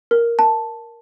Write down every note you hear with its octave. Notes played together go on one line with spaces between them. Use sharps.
A#4
A5